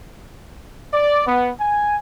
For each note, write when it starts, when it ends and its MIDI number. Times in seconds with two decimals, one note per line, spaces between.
0.94 1.26 74
1.27 1.49 59
1.60 1.96 80